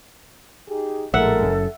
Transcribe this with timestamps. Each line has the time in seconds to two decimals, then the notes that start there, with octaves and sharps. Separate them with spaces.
0.68 D#4 G4 G#4
1.14 A#1 A2 G#3 A4 A#4 E5 F#5
1.43 F#1 F#2